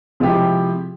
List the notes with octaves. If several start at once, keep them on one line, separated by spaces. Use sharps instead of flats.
C3 F3 G#3 E4 G4